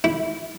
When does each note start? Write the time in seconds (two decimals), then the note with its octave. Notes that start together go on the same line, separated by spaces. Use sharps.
0.04 E4